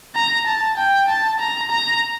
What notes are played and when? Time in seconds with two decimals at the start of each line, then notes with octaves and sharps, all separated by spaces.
0.15 A#5
0.47 A5
0.77 G5
1.09 A5
1.40 A#5
1.71 A#5